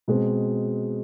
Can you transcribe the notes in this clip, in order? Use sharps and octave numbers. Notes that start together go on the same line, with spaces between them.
B2 G#3 C4